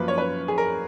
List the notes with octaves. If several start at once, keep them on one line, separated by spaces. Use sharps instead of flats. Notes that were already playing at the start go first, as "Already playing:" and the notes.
Already playing: F#2 F3 A#3 B4
C#5
B4
G#4
A#4